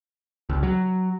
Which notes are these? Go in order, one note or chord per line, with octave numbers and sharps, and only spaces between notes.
C#2
F#3